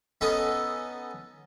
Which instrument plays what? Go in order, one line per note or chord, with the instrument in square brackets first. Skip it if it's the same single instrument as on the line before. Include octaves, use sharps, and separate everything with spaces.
[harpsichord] B3 C#4 D#4 A4